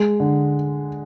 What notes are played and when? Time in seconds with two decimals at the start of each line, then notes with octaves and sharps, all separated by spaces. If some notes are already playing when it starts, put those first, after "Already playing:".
Already playing: G#3
0.20 D3